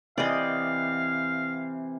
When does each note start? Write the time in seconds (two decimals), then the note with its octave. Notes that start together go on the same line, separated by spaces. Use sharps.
0.18 C3 E3 D5 D#5 F5